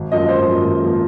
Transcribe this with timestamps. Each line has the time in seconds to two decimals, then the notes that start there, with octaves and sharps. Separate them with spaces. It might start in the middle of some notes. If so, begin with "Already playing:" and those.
Already playing: G#1
0.12 F#2 F3 A#3 D#5
0.29 G#1 C5
0.48 F#2 F3 A#3
0.65 G#1
0.83 F3 A#3